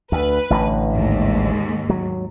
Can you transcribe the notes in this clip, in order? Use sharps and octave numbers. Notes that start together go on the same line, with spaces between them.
D2 B4
A1 A2 D3
D#2 G#2
F#3